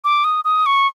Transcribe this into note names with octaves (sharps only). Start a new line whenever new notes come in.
D6
D#6
D#6
C#6